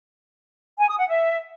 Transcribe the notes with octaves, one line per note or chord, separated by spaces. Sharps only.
G#5
D#6
F#5
E5